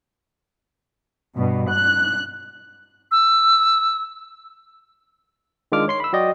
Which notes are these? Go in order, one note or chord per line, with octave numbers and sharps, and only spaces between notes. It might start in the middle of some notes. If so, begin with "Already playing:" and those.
G2 B2
F#6
E6
D#3 G#3 D4 F4 D6 F6
C#5 C6 C7
B5 E6
F#3 F#4 D5 D#5 G5